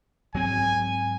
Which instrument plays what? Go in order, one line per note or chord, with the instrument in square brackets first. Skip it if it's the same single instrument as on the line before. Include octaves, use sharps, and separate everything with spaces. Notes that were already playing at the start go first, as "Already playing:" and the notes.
[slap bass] G#2 F#3 C4 [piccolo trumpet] G#5